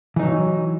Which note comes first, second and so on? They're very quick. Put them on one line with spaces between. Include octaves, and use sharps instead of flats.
E3 D#4 F#3